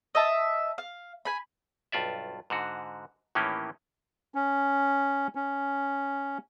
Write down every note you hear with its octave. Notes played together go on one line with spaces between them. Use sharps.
D#5 E5 A5
F5
G#5 B5
B1 G2 F4 D5 E5
G#2 D3 F#4
A2 D#3 E3 A#3 C#4 G4
C#4
C#4